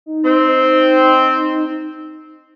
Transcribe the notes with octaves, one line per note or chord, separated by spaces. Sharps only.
D#4
C4